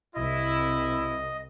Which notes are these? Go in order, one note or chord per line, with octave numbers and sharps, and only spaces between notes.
C2 E4 D#5